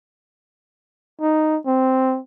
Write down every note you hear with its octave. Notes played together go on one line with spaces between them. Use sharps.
D#4
C4